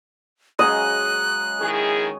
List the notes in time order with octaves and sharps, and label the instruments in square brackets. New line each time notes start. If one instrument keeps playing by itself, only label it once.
[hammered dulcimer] C#3 F#3 G#3 [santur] D#5 [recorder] F#6
[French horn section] D#3 E4 G#4 [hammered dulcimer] C#5